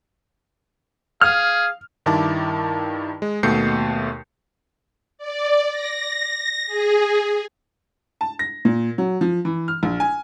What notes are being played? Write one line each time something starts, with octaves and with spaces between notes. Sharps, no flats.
G#4 F5 F6
G2 D#3 E4 A5 D6
G#3
D#2 B2 A3 G6 C7 C#7
D5
A#6
G#4
A5
A#6
A#2
F#3
F3
E3
F6
A#1
G#5